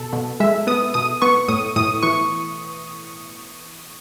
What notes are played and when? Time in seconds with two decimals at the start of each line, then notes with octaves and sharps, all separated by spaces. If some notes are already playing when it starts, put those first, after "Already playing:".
Already playing: B2 A4
0.13 B2
0.40 G#3 E5
0.67 B3 D#6
0.94 B2 D#6
1.22 B3 C#6
1.48 A2 D#6
1.76 A2 D#6
2.03 E3 C#6